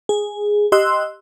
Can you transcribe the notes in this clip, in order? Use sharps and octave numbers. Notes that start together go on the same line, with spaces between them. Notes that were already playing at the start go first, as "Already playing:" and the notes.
G#4
G4 D#5 C6 E6 F#6